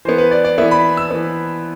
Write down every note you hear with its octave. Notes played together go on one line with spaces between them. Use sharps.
E3 B3 C5
B4
D5
D5
E3 B3 E5
B5
E6
E3 B3